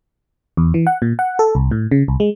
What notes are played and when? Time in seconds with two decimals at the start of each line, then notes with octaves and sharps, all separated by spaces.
0.57 E2
0.74 E3
0.87 F#5
1.02 A#2
1.19 F#5
1.39 A4
1.55 C2
1.71 A2
1.91 C#3
2.08 C2
2.20 G#3